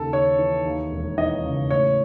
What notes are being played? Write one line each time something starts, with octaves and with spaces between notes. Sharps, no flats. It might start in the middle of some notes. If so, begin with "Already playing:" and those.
Already playing: D#2 C#3 A4
D#2 C#5
E3
D#2
E1
E3 D#5
C#3
A2 C#5